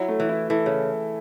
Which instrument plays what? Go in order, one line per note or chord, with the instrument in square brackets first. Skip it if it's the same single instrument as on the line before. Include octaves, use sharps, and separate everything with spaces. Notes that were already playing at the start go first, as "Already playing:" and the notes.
Already playing: [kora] F#3 [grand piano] E4
[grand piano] A3
[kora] E3
[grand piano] E4
[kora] E3 [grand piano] A4
[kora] C#3